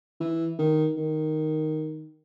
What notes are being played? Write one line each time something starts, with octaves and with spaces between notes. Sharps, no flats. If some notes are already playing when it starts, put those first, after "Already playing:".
E3
D#3
D#3